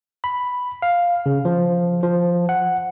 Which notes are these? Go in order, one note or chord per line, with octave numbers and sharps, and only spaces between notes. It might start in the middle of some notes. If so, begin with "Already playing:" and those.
B5
F5
C#3
F3
F3
F#5